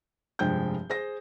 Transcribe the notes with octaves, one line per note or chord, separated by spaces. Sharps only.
F1 G2 F3 G#3 G5 G6
G#4 C5 A#6